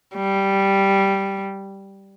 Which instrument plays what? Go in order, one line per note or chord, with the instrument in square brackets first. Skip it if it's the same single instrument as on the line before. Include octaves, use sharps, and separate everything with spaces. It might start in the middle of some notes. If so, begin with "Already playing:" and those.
[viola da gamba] G3